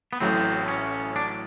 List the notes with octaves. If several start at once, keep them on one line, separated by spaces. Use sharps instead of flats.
B3
A1 A2 F#3 A3 C4
C#4
D4